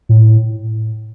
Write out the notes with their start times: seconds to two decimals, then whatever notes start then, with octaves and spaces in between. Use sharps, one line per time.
0.09 A2